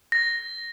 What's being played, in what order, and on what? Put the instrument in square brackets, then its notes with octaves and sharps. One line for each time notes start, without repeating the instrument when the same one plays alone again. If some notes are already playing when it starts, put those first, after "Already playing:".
[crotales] A#6